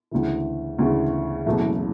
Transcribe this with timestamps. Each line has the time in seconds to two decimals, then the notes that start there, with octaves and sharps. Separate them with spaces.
0.11 D2 C#3 E3
0.79 D2 C#3 E3
1.46 F#1 E2 B2 F#3 A3